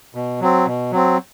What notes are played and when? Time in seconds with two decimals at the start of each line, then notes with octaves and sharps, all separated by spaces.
0.15 B2
0.41 F#3 C4
0.66 B2
0.92 F#3 C4